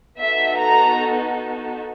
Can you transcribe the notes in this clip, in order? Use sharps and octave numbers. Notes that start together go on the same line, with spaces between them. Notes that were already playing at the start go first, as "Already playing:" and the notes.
B3 D#4 F#4 A4 E5
A#5